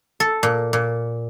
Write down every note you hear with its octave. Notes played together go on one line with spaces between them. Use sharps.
A4
A#2
A#2